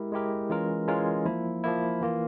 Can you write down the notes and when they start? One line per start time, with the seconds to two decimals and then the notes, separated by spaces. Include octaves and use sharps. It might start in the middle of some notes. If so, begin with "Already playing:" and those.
Already playing: G#3 E4 G4 A#4
0.12 G#3 E4 G4 A#4
0.50 E3 G#3 C#4 F4 A#4
0.88 E3 G#3 C#4 F4 A#4
1.26 F3 A#3 E4
1.64 F3 A#3 E4
2.02 E3 A#3 F4